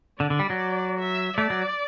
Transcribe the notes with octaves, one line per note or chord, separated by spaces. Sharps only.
D3 D5
D3
G3
F#3
E5
A3 D5
F#3